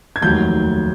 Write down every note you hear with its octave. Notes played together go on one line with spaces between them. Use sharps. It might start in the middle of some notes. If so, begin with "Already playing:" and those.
G#6
F1 D#2 D#3 F#3 A3 G6